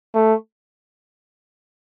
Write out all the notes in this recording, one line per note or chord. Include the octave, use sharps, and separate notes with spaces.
A3